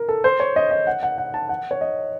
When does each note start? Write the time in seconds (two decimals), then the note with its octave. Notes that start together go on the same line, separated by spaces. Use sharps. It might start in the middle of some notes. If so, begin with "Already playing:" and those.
Already playing: A#4
0.09 A4
0.24 C5
0.40 C#5
0.56 D#5
0.71 D#5
0.87 F#5
1.03 F#5
1.18 F#5
1.34 A5
1.49 F#5
1.71 C#5
1.81 D#5